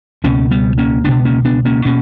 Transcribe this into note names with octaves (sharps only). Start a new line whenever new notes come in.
C#2 B2 A#3 C#4
G3 B3
A#3 C#4
C#2 B2 B3 D4
A#3 C#4
B3 D4
A#3 C#4
B2 A#3 C#4